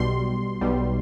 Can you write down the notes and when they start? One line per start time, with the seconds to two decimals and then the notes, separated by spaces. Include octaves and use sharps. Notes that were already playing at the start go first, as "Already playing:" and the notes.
Already playing: B1 B2 G3 C6
0.61 B1 B2 G3